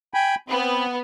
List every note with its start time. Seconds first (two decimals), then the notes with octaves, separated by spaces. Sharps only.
0.14 G5 G#5 B5
0.49 B3 C4